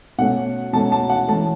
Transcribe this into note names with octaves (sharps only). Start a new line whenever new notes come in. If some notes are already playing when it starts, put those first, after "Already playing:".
B2 A3 C#4 F#5
B2 A3 C#4 A5
A5
F#5
E3 A3 C#4 A5